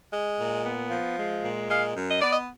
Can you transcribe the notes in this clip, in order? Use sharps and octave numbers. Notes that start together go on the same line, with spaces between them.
G#3
A#2
B3
F3
G#3
A#2
G#3 F5
F#2
D#5
B3 D5
D#5